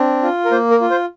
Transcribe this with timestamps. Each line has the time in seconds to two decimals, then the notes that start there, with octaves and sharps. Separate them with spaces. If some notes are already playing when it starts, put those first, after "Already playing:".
Already playing: C4 D4
0.23 F4
0.45 A#4
0.51 A#3 C5
0.71 A#4
0.81 F4
0.90 C5